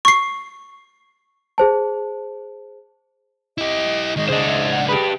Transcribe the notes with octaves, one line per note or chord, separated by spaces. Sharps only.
C#6 C7
G#4 C5 A5
E4 G4 D#5
D#3 G#3 D#5
C#2 D4 G#4 C5 D#5
E5
F#5
G4 G#4 B4